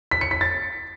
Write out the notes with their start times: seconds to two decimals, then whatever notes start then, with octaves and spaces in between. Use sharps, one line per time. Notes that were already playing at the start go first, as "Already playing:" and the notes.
0.11 B6
0.21 C#7
0.31 B6
0.41 A6